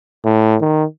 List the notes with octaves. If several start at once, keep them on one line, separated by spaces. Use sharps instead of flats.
A2
D#3